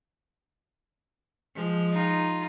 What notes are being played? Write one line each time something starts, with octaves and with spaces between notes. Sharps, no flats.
F3 G#3
D#4 F4